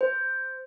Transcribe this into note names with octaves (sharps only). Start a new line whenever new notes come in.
C5